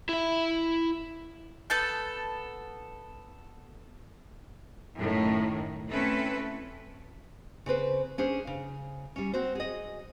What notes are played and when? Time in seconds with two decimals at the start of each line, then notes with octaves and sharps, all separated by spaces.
0.09 E4 E5
1.70 B3 A4 A5 G6
4.96 F#2 A2 D#3
5.89 A3 C4 C#4 E4 A4 B4
7.66 C#3 C4 B4 C5
8.18 C#4 D4 G#4 C5
8.47 C#3
9.16 G3 C#4
9.34 C4 F#4 C5
9.55 G#4 D#5